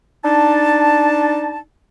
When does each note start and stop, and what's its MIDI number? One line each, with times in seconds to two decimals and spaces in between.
0.24 1.58 62
0.24 1.58 63
0.24 1.58 81